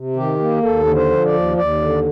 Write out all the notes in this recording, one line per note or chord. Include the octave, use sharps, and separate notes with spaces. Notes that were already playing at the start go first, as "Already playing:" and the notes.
Already playing: C3
D#3 G4
A#3
D#2 A4
D3
C5
F3
D5
D#2
D#2 D5
D3